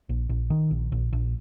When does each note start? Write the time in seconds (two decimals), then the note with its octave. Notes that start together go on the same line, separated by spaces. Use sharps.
0.09 A#1
0.29 A#1
0.50 D#3
0.71 A#1
0.92 A#1
1.13 A#1